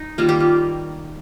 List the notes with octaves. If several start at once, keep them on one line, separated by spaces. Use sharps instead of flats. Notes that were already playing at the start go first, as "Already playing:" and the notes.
Already playing: D#4
D#3 G3 A#3 F4
G4
F4